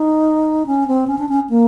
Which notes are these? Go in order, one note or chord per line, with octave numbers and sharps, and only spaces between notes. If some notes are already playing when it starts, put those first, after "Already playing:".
Already playing: D#4
C#4
C4
C#4
D4
C#4
A#3